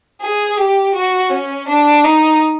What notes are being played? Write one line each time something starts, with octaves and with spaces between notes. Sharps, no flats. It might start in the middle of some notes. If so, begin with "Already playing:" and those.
G#4
G4
F#4
C#4
D4
D#4